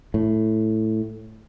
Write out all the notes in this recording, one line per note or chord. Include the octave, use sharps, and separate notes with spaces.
A2